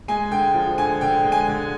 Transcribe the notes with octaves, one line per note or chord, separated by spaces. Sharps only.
G#3 G#5
D3 G5
F3
D3 G#5
D3 G5
G#3
G#5
D3